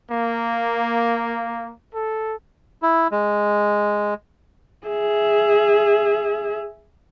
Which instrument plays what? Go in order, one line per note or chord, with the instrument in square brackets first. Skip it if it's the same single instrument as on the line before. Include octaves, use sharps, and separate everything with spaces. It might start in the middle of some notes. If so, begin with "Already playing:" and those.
[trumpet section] A#3
A4
[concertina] E4
G#3
[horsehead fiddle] G#4 E5